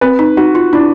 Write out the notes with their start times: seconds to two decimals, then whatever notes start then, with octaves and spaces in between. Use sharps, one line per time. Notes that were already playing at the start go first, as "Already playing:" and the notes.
0.01 C4 B4
0.19 D#4
0.37 D#4 F#4
0.55 F4
0.73 D4 E4